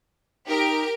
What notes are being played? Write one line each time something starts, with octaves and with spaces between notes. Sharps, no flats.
D#4 G4 A#4 D7